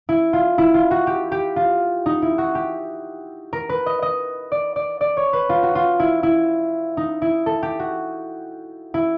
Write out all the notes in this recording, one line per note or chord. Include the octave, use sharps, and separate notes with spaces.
E4
F4
E4
F4
F#4
G4
G4
F4
D#4
E4
F#4
G4
A#4
B4
D#5
D#5
D5
D5
D5
C#5
B4
F4
F#4
F4
E4
E4
D#4
E4
A4
G4
F#4
E4